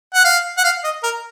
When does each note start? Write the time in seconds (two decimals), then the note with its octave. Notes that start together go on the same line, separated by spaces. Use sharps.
0.14 F#5
0.25 F5
0.58 F#5
0.64 F5
0.84 D#5
1.03 A#4